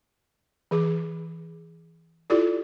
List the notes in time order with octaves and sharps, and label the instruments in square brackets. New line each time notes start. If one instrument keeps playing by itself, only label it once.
[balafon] E3 G#4 D6
E4 F4 G4 A4 D5